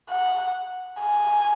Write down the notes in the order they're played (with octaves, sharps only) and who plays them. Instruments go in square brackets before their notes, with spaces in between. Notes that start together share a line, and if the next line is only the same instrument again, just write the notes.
[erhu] F#5
G#5